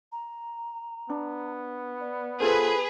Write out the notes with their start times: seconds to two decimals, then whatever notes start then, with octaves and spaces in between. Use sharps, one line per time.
0.12 A#5
1.10 B3 D4
2.00 D5
2.40 F4 G#4 A4 B4 C5 A5